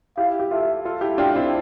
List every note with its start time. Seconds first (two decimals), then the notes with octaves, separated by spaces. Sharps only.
0.17 E4 G4 F5
0.40 G4
0.51 F4 A4 E5
0.85 F4 A4
1.01 E4 G4
1.18 D4 F4 G5
1.36 C4 E4